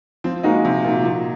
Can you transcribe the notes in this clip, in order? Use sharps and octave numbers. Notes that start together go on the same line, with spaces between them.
F3 C4
G#3 A#3 D#4 F#4
C3 F3
A#2 A#3 D#4 F#4
A#2 F3